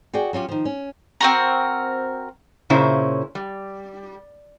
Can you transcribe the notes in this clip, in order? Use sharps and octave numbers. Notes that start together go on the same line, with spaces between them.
F#4 G#4 D5 G5
F#3 C#4 F4 G4
D#3 F3
C#4
C4 F#4 A#4
A#2 C#3 C#4 E4 C5
G3